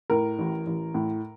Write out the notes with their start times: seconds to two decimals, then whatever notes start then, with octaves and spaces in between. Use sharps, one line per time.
0.10 A2 A#4
0.39 A1
0.67 A1
0.95 A2